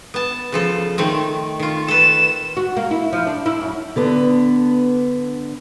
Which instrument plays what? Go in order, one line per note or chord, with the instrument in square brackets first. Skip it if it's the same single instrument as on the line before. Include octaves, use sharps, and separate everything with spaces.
[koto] B3 A5
C#3 F3 A4
D#3 A3 C4
D#3 F4
[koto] A4 B4 [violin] E7
[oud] F#4
A#3
E4
F3
D4
E4
F#2
[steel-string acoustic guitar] D3 B3 D4 A5